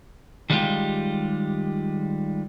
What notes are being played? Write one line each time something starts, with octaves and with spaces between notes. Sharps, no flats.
D#3 G3 G#3 D#4 F4 G4